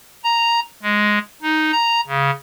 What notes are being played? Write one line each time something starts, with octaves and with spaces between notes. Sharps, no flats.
A#5
G#3
D#4
A#5
C#3